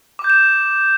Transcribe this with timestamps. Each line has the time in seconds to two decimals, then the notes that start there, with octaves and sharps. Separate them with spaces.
0.19 D6
0.24 G6
0.30 E7